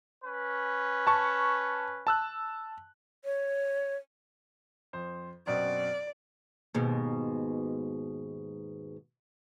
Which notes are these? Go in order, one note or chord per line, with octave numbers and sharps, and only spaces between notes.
C#4 B4
A5 C#6
A5 E6 F#6
C#5
F2 C5
F#2 B2 C4 D5
D#2 G#2 B2